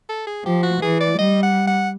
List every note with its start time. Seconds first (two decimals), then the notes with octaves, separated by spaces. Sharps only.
0.09 A4
0.27 G#4
0.45 F3 G4
0.63 F#4
0.81 E3 G#4
1.00 D5
1.18 G3 D#5
1.43 F#5
1.67 F#5